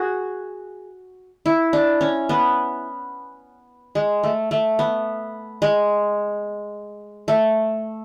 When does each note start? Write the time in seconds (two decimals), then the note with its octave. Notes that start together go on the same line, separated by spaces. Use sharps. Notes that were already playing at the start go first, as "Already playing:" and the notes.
Already playing: F#4 G#4
1.46 E4
1.73 D4
2.01 C#4
2.29 B3
3.95 G#3
4.23 A3
4.51 A3
4.79 B3
5.62 G#3
7.28 A3